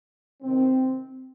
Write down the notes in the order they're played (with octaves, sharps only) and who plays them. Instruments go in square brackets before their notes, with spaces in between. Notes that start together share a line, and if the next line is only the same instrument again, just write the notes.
[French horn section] C3 D#3 C4